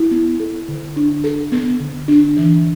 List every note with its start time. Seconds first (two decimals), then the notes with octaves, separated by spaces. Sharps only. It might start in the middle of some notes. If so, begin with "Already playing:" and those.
Already playing: E4
0.11 B3
0.40 A4
0.68 D3
0.96 D4
1.24 A4
1.52 B3
1.80 D3
2.08 D4
2.37 E3